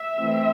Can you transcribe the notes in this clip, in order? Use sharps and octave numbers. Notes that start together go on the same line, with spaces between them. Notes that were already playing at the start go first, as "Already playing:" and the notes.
Already playing: E5
E3 A3 C4